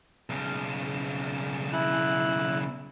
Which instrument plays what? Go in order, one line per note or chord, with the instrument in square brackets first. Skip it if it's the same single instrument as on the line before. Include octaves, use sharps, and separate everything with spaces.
[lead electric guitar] B1 C#3
[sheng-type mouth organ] E4 F#6